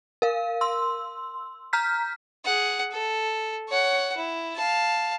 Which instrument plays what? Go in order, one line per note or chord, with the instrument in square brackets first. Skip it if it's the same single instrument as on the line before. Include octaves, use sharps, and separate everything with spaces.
[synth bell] A#4 F5
C6 E6
A#5 F6 G6 B6
[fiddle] G#4 F#5
A4
C#5 F#5
E4
F5 A5